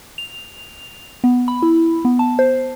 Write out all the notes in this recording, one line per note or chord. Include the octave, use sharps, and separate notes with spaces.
F7
B3
B5
E4
B3
A5
C5